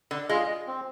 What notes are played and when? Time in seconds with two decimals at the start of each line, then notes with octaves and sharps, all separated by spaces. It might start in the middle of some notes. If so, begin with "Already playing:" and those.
0.11 D3
0.29 G#3 F4 G#4
0.67 C4